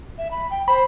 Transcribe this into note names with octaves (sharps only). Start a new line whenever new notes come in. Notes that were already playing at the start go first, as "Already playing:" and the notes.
E5
B5
G5
C5 B5